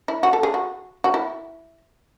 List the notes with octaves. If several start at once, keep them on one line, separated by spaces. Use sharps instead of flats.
E4
F#4
A4
G#4
F#4
F#4
E4